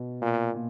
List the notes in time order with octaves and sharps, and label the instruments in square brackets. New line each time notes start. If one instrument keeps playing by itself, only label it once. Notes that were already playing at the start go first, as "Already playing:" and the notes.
Already playing: [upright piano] B2
[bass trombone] A#2
[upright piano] A#2